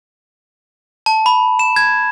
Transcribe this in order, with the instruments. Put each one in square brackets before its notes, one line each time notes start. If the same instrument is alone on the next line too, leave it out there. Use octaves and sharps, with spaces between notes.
[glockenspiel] A5
B5
E7
G#6